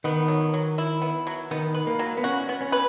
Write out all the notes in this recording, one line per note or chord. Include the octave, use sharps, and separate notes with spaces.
D#3 B3
F#3
F#3
E4
B3
F#3
D#3 B3
B4
A#3
F#3
B3
C#4 F#4
B3
C#4
B4